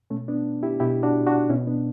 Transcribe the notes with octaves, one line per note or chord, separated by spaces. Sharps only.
B2 A3 C#4
B3 D4
E4 G4
B2 E4 G4
D4 F#4
D4 F#4
B2 C#4 E4
B3 D4